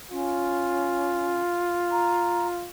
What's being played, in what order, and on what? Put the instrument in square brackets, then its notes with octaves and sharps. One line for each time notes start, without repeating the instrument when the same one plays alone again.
[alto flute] C#4 [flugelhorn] F4
[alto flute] A#5